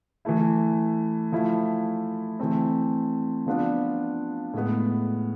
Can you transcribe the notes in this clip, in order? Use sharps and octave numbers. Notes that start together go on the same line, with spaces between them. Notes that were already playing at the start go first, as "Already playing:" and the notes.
E3 A3 E4
F3 A3 E4
E3 A3 C4
F3 B3 D4 F4
A2 G#3 B3